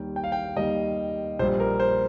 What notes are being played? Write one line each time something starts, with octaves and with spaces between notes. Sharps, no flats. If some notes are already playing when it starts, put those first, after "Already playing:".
Already playing: D#2 D#3 G3 G5
G5
F5
G5
D#2 D#3 G3 D#5
A#1 A#2 G3 C5
A#4
C5